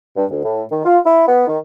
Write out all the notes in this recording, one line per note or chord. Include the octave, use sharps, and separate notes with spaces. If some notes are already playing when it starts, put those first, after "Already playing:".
G2
D2
A2
D#3
F4
E4
B3
D#3